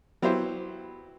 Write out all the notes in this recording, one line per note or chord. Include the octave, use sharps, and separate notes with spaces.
F#3 B3 E4 G4 C5